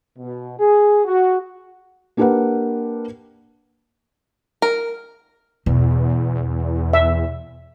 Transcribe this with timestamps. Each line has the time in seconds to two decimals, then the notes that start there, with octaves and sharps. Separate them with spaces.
0.17 B2
0.58 G#4
1.05 F#4
2.17 A#3 D4 G4 A#4 B4 F#5
4.62 A#4
5.66 E2 B2
6.93 E5